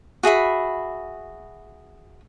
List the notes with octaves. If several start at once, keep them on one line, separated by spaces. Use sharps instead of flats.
F#4 G#4 E5 B5